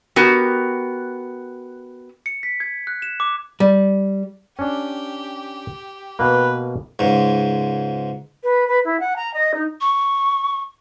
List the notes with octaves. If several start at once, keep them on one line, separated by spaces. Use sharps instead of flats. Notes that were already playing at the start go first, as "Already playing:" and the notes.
B3 F#4 G4 A#4
C#7
B6
G#6
F#6
E7
D6
G3
C#4 D4 G4
B2 A#3 B4
C#2 G#2
B4
B4
E4
F#5
A#5
D#5
D#4
C#6